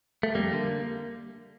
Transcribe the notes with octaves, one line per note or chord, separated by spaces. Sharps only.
A3
F2 G3 A#3
D3 G3